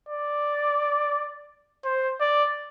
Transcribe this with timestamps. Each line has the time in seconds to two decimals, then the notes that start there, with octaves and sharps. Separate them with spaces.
0.09 D5
1.85 C5
2.21 D5